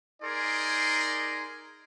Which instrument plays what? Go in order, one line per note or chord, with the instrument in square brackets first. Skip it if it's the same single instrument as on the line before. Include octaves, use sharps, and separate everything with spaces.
[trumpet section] D#4 G#4 A#4 D5 G#5 C6